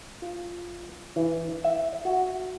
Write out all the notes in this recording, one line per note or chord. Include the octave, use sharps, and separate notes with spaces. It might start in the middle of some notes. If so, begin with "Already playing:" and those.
F4
E3
E5
F#4